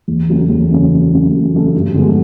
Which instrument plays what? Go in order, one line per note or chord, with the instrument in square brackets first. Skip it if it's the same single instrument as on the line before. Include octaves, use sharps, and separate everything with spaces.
[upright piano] E2
C#3 F#3 A3 C#4
E2
C#3 F#3 A3 C#4
E2
C#3 F#3 A3 C#4
E2
C#3 F#3 A3 C#4
G2
D3 F3 G#3 B3